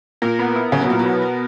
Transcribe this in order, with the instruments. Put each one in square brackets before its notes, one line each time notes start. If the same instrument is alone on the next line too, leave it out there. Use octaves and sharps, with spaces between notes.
[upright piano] A#2 [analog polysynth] A#4
[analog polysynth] B3
E4
[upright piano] C#3 [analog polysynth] F#3
[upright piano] B2
[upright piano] A#2 [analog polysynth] A#4
[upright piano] B2
[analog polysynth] B3
A#4